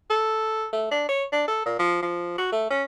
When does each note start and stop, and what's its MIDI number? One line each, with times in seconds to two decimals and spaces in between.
0.10 0.66 69
0.73 0.86 57
0.91 1.07 62
1.09 1.24 73
1.32 1.45 62
1.48 1.64 69
1.65 1.74 46
1.79 1.98 53
2.02 2.34 53
2.38 2.47 66
2.52 2.67 57
2.70 2.84 61